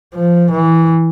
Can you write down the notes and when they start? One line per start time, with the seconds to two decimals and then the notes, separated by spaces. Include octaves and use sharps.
0.15 F3
0.51 E3